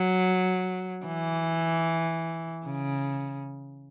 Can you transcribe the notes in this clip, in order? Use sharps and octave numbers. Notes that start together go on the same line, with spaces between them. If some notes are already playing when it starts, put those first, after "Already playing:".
Already playing: F#3
E3
C#3